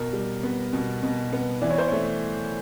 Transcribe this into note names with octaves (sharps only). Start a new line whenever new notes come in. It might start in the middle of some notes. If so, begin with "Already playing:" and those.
Already playing: B2 A#4
G3
B3
B2
B2
B3
E3 D5
C#5
C5
A3 C#5